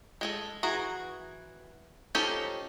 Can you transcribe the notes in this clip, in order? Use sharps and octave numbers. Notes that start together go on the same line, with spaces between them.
G#3 G#4 A4
E3 F#4 G#4 A#5
F3 C#4 D#4 G4 A4